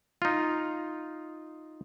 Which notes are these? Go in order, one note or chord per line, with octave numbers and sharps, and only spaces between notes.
D#4 F4